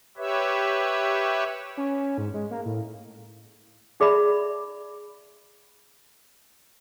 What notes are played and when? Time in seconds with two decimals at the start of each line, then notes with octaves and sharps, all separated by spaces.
0.17 G4 B4 C#5 E5
1.77 C#4
2.18 G#2
2.34 G#3
2.51 A#3
2.65 A2
4.00 D#4 G#4 D5 E5 B5